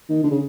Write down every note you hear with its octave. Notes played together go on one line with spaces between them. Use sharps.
D#3
D3
C#3